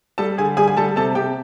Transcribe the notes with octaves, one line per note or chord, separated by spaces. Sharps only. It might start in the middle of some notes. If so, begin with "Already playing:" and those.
G3 A4 A5
D3 G#4 G#5
G3 G#4 G#5
G#5
G3 A4 A5
C3 A4 A5
C3 G4 G5